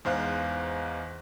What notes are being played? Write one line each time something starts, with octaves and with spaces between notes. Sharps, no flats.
E2 G#2 C5 F5 F#6